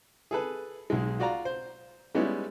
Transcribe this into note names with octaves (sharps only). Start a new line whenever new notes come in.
G#4 A4 B4
B1 G#3
F4 F#4 D5 F5 A#5
C5
G3 G#3 B3 C#4 D#4 E4